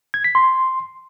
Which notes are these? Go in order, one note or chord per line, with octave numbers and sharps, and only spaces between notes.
G#6
B6
C6